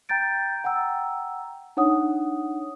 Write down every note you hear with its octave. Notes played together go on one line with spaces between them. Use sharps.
G5 A#5 G6 A6 D7
F#5 G5 A#5 E6
D4 D#4 C#5 F#5 D#6